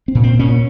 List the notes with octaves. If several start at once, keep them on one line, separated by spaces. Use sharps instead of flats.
C4
A#2
C4
A#2 C#4